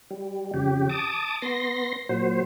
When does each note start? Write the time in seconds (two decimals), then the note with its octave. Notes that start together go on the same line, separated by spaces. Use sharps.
0.11 G3
0.54 F2 C#3 G4
0.89 A5 D6 D#6
1.42 B3 C6 A#6
2.09 A#2 F#3 C5